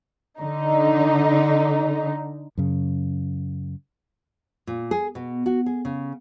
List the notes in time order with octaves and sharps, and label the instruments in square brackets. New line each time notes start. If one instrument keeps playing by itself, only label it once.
[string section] D3 D#4
[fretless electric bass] F#2 C#3
[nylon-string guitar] A#2
G#4
B2
F#4
G#4
C#3